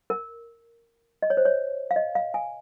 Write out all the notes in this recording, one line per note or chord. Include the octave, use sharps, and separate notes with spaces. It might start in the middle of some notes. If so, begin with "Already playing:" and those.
A#4
D#5
C#5
C5
C#5
F5
D#5
F5
G#5